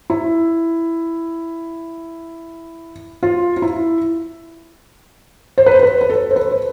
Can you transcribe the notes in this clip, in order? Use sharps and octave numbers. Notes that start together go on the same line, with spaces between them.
E4
F4
F4
E4
C5
B4
C5
B4
B4
A4
C5
B4
C5